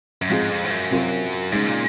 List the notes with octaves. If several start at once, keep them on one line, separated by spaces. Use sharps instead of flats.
F#2
G#2 F3 G#3 C4 F4 G#4
F2
G#2
F#2
C3 F#3 C4 F4 A#4
G#2 C#3 G#3 D#4
A#2